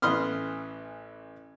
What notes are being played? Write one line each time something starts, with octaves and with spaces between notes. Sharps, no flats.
A1 E3 B4 C6 D#6 F6